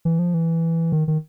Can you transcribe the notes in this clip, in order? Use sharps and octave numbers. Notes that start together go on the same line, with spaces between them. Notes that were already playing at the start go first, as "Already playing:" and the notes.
E3
F3
E3
D#3
D#3